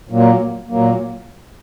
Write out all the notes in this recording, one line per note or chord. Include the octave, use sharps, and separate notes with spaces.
A#2 F#3 A#3
A#2 F#3 A#3